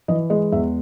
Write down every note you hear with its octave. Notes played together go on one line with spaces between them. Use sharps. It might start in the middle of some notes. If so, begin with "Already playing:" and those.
E3 D#5
G#3 D#5
E2 E5